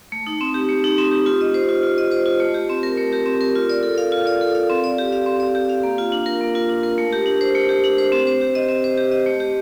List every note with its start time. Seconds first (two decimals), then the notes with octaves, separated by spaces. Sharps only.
0.12 A3
0.27 D#4
0.41 C4
0.54 G4
0.69 A3
0.84 D#4
0.98 C4
1.11 G4
1.26 F4
1.41 D#5
1.54 C5
1.69 F4
1.83 F4
1.98 D#5
2.11 C5
2.26 F4
2.40 A3
2.54 G4
2.69 C4
2.83 A#4
2.97 A3
3.13 G4
3.26 C4
3.41 A#4
3.55 F4
3.69 D5
3.83 A4
3.98 F5
4.12 F4
4.27 D5
4.41 A4
4.55 F5
4.70 C4
4.84 D5
4.98 G4
5.12 F5
5.26 C4
5.40 D5
5.55 G4
5.69 F5
5.83 A#3
5.98 F4
6.12 D4
6.26 A#4
6.41 A#3
6.55 F4
6.69 D4
6.83 A#4
6.98 A3
7.13 G4
7.26 D4
7.41 C5
7.55 A3
7.69 G4
7.84 D4
7.98 C5
8.12 C4
8.27 C5
8.41 G4
8.55 D#5
8.69 C4
8.84 C5
8.98 G4
9.12 D#5
9.26 A3
9.40 G4